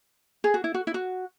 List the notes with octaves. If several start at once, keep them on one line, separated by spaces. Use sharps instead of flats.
G#4
F#4
E4
F#4
E4
F#4